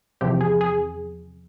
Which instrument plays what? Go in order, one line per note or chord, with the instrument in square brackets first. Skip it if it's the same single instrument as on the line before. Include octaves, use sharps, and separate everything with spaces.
[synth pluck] E2 C3 F3 C4 G4
G#4
G#4